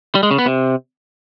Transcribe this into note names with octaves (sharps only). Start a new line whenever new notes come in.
G3
G#3
C#3
B3
C3